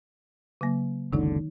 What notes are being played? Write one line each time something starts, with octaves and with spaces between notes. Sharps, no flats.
C#3 F#3 A#3
F#1 C#2 D3 D#3 D#4